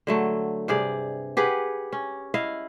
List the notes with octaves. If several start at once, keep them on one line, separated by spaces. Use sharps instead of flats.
D3 F#3 A3
G2 C3 G#4 D5
G4 G#4 B4 F#5
C#4
E4 D#5 F5